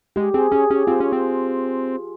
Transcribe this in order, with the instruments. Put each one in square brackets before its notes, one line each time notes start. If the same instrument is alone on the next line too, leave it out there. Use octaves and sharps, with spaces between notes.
[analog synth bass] G#3 [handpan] G4
[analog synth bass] C4 [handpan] G#4
[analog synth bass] C#4 [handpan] G#4
[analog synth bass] C#4 [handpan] G4
[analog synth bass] C4 [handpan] F4
[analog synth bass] C#4
C4